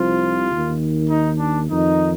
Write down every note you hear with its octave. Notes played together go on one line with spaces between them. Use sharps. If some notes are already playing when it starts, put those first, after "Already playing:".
Already playing: C2 C3 F3 F4
D#2 D#3
D#4
D4
F2 D#3 D#4